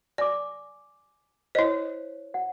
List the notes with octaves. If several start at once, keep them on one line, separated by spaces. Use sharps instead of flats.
D5 G#5 D6
E4 C5 C#5 D#5
F#5